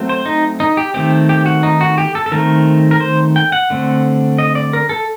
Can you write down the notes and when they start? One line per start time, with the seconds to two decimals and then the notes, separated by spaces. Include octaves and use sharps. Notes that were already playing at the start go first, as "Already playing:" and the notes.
Already playing: F#3 A3 C4
0.09 C5
0.26 D#4
0.60 D#4
0.77 G4
0.94 D#3 A3 C4 G4
1.29 G4
1.46 F#4
1.63 D#4
1.81 F#4
1.98 G4
2.15 A4
2.26 A4
2.32 D#3 A3 C4 A#4
2.91 A#4
3.00 C5
3.36 G5
3.52 F#5
3.70 D3 A3 C4
4.38 D#5
4.55 D5
4.73 A#4
4.89 A4